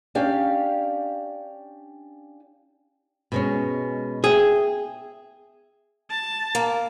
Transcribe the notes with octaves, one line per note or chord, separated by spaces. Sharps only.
C#4 D4 G4 F5
B2 G#3 C#4
G#4 E5 G5
A5
A#3